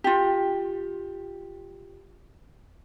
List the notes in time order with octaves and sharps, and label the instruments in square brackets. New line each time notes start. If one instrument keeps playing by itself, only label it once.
[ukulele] F4 G4